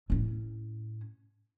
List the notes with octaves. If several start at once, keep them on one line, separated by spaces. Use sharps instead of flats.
A2 C#4